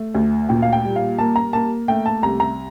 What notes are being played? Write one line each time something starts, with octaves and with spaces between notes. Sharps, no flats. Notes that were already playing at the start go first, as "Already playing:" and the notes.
Already playing: A3
D2
A#2 G5
F5
G5
G3
F5
A#3 A5
A#5
A#3 A5
A3 G5
A5
C2 A#5
A#5